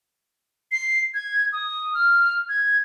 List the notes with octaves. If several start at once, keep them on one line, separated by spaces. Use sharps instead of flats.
C7
G#6
D#6
F6
G#6